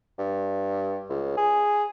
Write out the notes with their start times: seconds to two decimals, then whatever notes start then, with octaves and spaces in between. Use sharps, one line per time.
0.18 G2
1.09 C#2
1.37 G#4